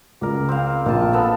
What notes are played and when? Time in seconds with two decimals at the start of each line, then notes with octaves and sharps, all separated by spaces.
0.21 C#2 A#4 D5
0.49 C4 F5
0.86 A#1 A#4 D#5 A5
1.13 B3 A4 E6